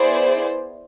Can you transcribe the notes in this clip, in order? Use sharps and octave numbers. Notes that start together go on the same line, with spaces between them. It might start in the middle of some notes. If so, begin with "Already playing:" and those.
Already playing: B3 E4 G#4 C5 D5